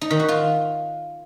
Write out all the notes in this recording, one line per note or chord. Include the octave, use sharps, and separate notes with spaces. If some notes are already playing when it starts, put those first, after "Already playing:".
D#4
D#3
F#4
F4